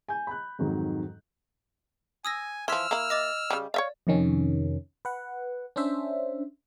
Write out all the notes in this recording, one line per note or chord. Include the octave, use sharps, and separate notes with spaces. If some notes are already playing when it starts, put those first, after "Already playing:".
G#5 G6
B5 F#6
F2 G#2 D#3 F#3
G#5 D#6 E6 A#6
E3 F3 C6 E6 F6 B6
A#3 E4
D#5 D6 A6
C#3 G3
C#5 D5 E5 F5
F2 C3 D#3 C#4
B4 F#5
C#4 D4 C5 E5